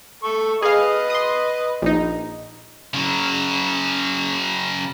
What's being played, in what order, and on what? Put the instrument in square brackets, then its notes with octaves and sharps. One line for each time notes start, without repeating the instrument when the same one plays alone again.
[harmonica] A4 C#6
[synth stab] G#4 F5 [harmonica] B4 D#5
[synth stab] C6 D#6
A#1 D#4
[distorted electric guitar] C#3 F#3